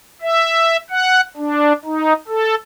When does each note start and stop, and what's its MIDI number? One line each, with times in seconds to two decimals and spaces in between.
0.22 0.77 76
0.90 1.21 78
1.37 1.73 62
1.85 2.13 63
2.28 2.55 69